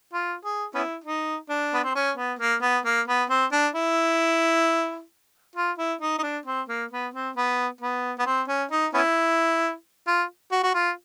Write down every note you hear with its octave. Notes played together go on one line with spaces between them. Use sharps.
F4
G#4
B3 C#4 E4
D#4
D4
B3
C4
C#4
B3
A#3
B3
A#3
B3
C4
D4
E4
F4
E4
D#4
D#4
D4
C4
A#3
B3
C4
B3
B3
B3
C4
C#4
D#4
B3 C#4 E4
F4
F#4
F#4
F4